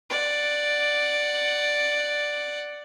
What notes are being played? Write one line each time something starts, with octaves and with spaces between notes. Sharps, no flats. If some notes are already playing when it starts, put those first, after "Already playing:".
D5 F#5